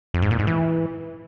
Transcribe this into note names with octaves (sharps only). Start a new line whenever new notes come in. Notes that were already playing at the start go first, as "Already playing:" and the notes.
F2
G#2
A#2
G#2
E3